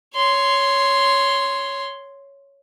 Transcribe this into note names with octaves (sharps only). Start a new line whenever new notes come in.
C#5 C6